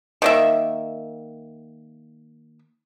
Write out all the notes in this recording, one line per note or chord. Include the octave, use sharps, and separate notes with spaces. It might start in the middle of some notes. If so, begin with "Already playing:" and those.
D#3 A#3 E5